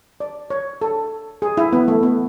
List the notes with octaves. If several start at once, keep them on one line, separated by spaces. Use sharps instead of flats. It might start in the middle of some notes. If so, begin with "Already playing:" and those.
D5
C#5
A4
G#4
E4
B3
A3
B3